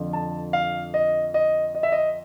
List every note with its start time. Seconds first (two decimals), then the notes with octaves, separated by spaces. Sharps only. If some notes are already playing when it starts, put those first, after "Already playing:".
Already playing: F2 D3 F3
0.13 A5
0.53 F5
0.94 D#5
1.34 D#5
1.75 D#5
1.83 E5
1.92 D#5